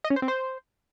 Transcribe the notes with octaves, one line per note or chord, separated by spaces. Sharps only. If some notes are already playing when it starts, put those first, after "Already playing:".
D#5
C#4
C5
C4
C5